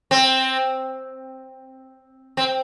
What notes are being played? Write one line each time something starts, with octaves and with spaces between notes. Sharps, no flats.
C4
C4